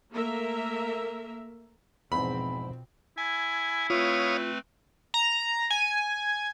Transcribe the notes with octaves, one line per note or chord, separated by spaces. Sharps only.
A3 A#3 A#4 E5
E2 G#2 B2 F3 C4 B5
E4 G#5
A3 C4 F4 B4 C#5 F5 D#6
A#5
G#5